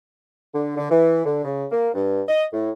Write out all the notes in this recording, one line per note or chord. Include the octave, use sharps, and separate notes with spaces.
D3
D3
E3
D3
C#3
A#3
G2
D#5
A2